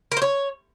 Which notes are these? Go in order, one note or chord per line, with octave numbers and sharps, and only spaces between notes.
A#4
C5
C#5